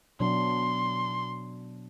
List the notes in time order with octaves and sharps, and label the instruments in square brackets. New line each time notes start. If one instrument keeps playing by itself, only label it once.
[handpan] B2 F#3 D4 [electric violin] C6